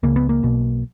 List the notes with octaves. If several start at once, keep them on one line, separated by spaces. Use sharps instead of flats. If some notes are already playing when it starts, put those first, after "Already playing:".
C#2 C#3 A#3
B3
A#3
B1 B2